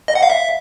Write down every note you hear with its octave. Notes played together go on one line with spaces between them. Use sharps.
D#5
F#5
F5
E5